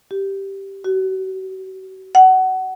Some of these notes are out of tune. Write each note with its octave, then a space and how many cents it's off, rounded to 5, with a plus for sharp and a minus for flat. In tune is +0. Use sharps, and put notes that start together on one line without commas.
G4 -5
F#4 +40
F#5 +20